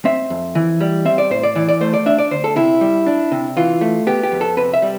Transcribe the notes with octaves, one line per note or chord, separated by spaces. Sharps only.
C4 E5
F2
E3
G3
C4 E5
D5
A2 C5
D5
E3 D5
D5
A3 C5
D5
D4 E5
D5
D2 C5
A4
C3 E4
G3
D4
C3
E3 F4
A3
B3 G4
G4
F2
A4
C3 B4
E5
G3